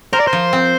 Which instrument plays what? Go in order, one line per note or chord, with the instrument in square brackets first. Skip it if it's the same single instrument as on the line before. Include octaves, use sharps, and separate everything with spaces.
[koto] A#4 [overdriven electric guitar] C5
[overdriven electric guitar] D5
C5
[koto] F3
C4